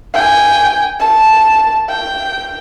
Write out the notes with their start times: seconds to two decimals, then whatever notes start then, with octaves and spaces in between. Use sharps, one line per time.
0.14 G5 G#5
1.00 A5
1.89 G5